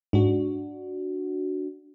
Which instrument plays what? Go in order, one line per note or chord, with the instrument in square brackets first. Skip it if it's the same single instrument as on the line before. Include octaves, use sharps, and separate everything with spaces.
[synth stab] G#2 [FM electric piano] D4 F#4